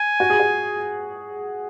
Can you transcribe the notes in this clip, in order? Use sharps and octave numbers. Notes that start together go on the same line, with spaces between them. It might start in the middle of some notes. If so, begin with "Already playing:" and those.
Already playing: G#5
F#4
G#4
F#4